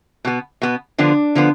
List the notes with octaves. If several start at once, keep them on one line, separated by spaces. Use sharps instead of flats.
B2 B3
B2 B3
D3 F3 B3 D4
D3 F3 B3